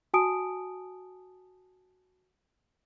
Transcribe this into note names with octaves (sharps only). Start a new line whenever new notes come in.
F#4 G#5 A5 D#6 D7